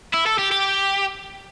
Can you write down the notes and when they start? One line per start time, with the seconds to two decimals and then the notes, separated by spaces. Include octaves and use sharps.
0.14 E4
0.26 A4
0.39 G4
0.52 G4